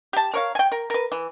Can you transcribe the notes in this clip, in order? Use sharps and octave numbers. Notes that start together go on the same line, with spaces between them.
G4 A5
A#4 C#5 F5
G5 G#5
A#4
A#4 B4
E3